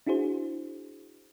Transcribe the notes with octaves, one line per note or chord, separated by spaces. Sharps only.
D4 E4 F#4 G#4 C5